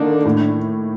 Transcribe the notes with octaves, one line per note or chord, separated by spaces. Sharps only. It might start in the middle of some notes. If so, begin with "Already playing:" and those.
Already playing: D3 D#3 A#3 D4 D#4
A2